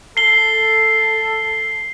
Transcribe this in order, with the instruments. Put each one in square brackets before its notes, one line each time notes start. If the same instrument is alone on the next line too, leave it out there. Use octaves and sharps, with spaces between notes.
[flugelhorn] A4 [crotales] C7 G7